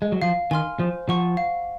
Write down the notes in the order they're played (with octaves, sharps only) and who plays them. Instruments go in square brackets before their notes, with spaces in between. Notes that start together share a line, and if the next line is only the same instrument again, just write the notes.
[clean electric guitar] G#3
F#3
[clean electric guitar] F3 [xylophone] F5
[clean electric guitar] D#3 [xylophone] G#5 C6 F6
[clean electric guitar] F3 [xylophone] C5
[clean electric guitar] F3 [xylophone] F#5 C#6
[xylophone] F5